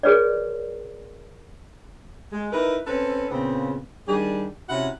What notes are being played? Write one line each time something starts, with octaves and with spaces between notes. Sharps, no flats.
F#4 G#4 A#4 B4 C#5 D5
G#3
D#4 E4 A#4 B4
C4 C#4 A4 B4
A#2 C#3 B3 C4
D#3 G3 D4 G#4
C3 C#4 E4 F#4 F#5